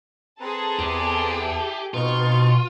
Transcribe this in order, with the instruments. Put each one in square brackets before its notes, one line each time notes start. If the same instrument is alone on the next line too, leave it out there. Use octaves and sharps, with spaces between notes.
[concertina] C4 B4 A#5 [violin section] G#4 A4 A5
[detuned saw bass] E2 [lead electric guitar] G4
[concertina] E4
[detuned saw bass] B2 [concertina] C4 D#4 [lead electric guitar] F4 [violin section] C#6